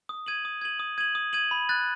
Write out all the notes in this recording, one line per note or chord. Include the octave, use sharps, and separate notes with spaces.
D#6
G#6 D#7 F#7
D#6
G#6 D#7 F#7
D#6
G#6 D#7 F#7
D#6
G#6 D#7 F#7
B5
F#6 A6